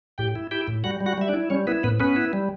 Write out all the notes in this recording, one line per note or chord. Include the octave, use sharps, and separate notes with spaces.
A2 G4 G5
E4
E4 G4 G5
A2
G3 F#4 F#5
G3
F#4 F#5
G3 E5
D4 D5
E4
G3 C#4 C#5
B3 E4 B4
A2 B3 B4
B3 C#4 B4
E4
G3